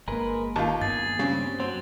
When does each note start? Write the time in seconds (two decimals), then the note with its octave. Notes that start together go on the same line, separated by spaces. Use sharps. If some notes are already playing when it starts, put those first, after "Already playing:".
0.08 G1 G#3 A#3 A#4 B4
0.56 D#2 F4 A5 G6
0.81 G2 A#3 B3 G#4 A6
1.19 C#3 G3 C4
1.60 F#3 C4